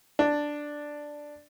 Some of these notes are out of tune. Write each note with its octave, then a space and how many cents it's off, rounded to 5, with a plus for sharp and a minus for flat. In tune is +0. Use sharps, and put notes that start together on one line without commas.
D4 +0